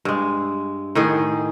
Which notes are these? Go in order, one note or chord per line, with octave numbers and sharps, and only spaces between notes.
G2 G#3
A2 D#3 G#4